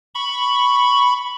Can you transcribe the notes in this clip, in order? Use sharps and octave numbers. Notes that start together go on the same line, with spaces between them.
B5 C#6